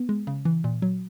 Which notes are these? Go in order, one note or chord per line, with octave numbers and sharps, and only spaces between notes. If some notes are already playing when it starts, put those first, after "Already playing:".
Already playing: B3
G#3
C#3
E3
A#2
F#3